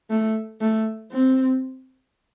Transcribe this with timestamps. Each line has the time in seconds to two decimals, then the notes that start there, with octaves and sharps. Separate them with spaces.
0.10 A3
0.61 A3
1.11 C4